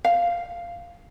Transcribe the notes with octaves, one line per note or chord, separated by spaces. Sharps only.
F5